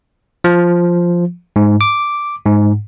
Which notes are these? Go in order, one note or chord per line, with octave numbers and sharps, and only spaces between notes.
F3
G#2
D6
G#2